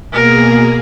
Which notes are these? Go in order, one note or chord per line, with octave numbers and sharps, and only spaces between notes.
B2 A#3 G#4 A#4